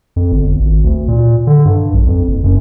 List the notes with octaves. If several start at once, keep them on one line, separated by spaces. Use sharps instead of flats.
F2
G1
G#1
D2
A#2
D3
G2
B1
F2
F#1
F#2